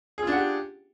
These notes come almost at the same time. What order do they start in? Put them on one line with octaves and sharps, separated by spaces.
G#4 F4 D4 F#5 G4